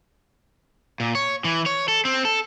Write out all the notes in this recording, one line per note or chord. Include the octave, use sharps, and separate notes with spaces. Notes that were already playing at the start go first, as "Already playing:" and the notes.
A#2
C#5
E3
C#5
A4
C4
A4